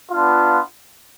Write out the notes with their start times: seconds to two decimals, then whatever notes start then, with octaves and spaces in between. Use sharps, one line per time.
0.11 B3 D4 F4